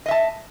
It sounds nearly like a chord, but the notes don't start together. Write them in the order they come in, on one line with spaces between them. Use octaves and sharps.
D#5 E5 A5